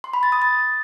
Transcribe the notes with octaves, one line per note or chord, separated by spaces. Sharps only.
C6
B5
A6
D#6
A6